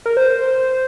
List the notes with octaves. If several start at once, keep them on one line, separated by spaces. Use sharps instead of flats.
A#4
C5